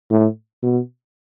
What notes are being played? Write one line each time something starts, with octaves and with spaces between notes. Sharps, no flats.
A2
B2